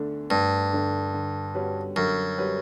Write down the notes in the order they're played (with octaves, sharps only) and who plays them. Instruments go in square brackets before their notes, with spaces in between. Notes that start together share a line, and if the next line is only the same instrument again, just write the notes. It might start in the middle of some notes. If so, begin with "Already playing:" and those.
Already playing: [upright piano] D2 D3 A3 D4
[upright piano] D2 [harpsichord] G2
[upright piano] D3 A3 D4
D3
G3 C#4 F#4 B4
[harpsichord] F#2 [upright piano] D3
[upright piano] G3 C#4 F#4 B4